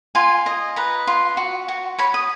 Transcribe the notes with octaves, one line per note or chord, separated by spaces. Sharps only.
F4 G#5
D#5
B4 A#5
F4
F#4
F#4
C#5 B5
D#6